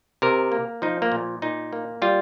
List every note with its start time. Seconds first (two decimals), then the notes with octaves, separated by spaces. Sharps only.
0.22 C3 A#4
0.52 A#3
0.82 F3 D#4
1.02 A#3
1.12 A#2
1.42 A#2 D#4
1.73 A#3
2.02 G3 F4